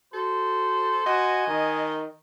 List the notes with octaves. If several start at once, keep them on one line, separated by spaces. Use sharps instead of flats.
F#4 A4 C5
F#4 D#5 G#5
D#3